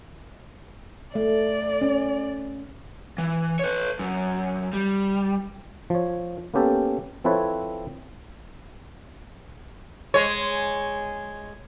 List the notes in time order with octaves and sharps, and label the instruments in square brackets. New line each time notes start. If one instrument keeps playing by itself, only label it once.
[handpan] A3 [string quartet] D5
[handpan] C#4
[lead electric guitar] E3
B4 C#5
F#2
G3
[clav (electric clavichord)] F3 C#5
A#3 B3 C#4 G4 A4
F3 C4 E4 A4 B4 C#5
[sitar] G#3 C#5